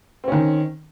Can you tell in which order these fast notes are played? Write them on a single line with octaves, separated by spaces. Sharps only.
C4 C#4 D#3